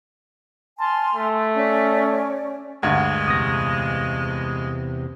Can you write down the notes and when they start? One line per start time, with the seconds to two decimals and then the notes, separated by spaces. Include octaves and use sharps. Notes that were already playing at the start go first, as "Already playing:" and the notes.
0.79 G#5 A5 C6 F6
1.15 A3
1.55 C#4 D5
2.83 D2 G2 G#3 F#5 G#6
3.28 E2 C3 D#6 A#6